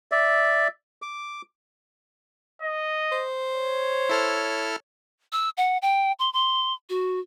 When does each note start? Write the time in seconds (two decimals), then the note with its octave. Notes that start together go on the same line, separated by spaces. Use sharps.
0.12 D5 E5
1.02 D6
2.62 D#5
3.12 C5
3.54 C#5
4.09 E4 A4 F6
5.32 E6
5.57 F#5
5.82 G5
6.19 C6
6.33 C6
6.89 F#4